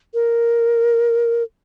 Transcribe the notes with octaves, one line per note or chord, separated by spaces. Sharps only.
A#4